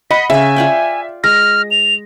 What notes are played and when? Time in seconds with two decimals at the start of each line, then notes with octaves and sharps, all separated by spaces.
0.11 D#5 F#5 B5 B6
0.30 C#3 C#4 E5 G#5
0.56 F4 D5 G5
1.24 G#3 F6 A#6
1.71 F7